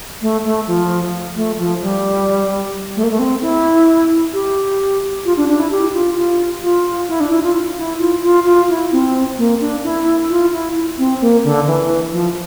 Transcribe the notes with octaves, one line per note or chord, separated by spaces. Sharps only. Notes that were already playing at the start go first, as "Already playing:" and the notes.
A3
A3
F3
A3
F3
G3
A3
A#3
A3
C4
E4
G4
F4
D4
D4
E4
G4
F4
F4
F4
E4
D4
E4
F4
E4
F4
F4
F4
E4
C4
A#3
D4
E4
F4
E4
C4
A#3
D3
E3
F3